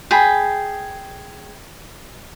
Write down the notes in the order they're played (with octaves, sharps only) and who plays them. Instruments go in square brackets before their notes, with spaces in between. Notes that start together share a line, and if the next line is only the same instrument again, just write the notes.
[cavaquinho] G#4 G5 A5 B5